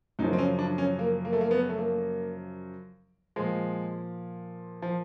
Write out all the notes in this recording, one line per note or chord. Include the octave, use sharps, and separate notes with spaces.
F#2 C#3 F3 D#4
C4
C#4
D4
C#4
A#3
A#3
A3
A#3
B3
A3
A#3
A#2 F3 G#3
F3